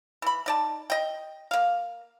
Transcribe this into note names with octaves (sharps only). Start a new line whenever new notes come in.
E3 B5
D#4 D5 A5
D#5 G5
A#3 F5